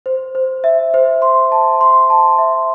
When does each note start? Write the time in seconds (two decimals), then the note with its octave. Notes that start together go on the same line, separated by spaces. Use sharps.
0.06 C5
0.35 C5
0.64 E5
0.94 C5
1.22 C6
1.52 A5
1.81 C6
2.10 A5
2.38 E5